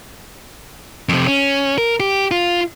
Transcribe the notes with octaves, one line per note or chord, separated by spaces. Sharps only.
F2 C3
C#4
A#4
G4
F4